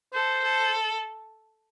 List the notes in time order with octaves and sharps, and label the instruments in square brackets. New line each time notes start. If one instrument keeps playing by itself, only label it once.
[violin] A4 [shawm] C5
[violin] A4